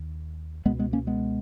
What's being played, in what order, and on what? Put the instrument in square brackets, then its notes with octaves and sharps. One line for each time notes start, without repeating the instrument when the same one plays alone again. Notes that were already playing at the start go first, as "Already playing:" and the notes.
Already playing: [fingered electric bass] D#2
C#2 B2 G#3 B3
G#3 B3
A#3 C#4
G#3 B3